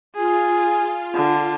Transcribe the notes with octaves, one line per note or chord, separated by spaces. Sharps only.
F4 G#4
D3